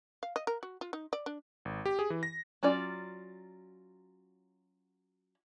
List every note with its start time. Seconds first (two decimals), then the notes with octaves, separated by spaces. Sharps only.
0.23 F5
0.36 D#5
0.47 A#4
0.63 F#4
0.81 F4
0.93 D#4
1.13 D5
1.26 D4
1.65 G#1
1.86 G4
1.99 G#4
2.10 E3
2.23 A#6
2.63 F#3 C#4 F4 D5